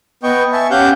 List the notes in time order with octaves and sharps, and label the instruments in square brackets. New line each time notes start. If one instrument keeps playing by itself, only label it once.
[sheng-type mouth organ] B3 D#5 G5 C#6
E5 G#5 A5 C#6
C#4 G4 F5 F#5 G6